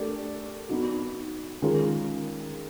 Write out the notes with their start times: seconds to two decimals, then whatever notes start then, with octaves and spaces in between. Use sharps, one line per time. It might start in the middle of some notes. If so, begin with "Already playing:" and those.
Already playing: A3 D4 G4 A#4 D5
0.69 B3 D#4 F#4
1.62 D#3 G#3 C#4 F4 A#4